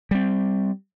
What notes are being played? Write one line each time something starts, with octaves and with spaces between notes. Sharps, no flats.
G3 C4